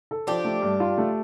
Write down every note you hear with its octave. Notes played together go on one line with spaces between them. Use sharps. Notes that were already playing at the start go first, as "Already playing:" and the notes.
A4
F3 D4 G4
A3
G2
F4
A3